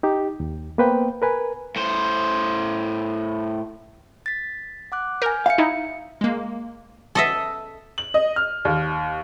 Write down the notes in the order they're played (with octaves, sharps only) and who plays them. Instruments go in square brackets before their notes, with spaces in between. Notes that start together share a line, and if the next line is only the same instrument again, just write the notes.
[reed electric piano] D#4 G4
D#2
A#3 B3 B4 C5 G5
A#4 B4 G#5
[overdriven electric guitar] A2 C5
[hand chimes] A6 B6
F#5 D6 F#6
[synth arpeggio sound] A#4 [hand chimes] G#5 F6 G6
[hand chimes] E5 C#7 [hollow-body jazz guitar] F5
[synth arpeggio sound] D#4 E4
[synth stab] G#3 A#3
[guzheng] A4 D#5 E5
[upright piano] F#7
D#5
F6
D#2